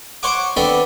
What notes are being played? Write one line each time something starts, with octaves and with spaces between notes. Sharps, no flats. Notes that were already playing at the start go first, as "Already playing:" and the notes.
C5 C#5 F#5 D6
B3 C4 D4 A4